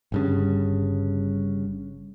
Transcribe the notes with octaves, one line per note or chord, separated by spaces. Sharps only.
G1 G2 C#3